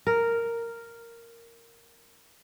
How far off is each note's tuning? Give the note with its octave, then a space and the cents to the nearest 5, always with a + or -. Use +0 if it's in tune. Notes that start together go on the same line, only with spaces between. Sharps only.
A#4 -5